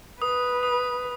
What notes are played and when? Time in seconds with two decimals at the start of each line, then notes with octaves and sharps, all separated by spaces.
0.22 B4 D#6
0.63 D#6